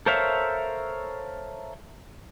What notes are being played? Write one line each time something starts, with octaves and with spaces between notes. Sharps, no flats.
A4 A#4 C5 C#5 E5 F5